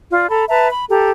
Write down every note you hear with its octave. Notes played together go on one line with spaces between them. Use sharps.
F4 D5
A4 A#5 B5
B4 E5 A5 A#5
B5
G4 A4 A#5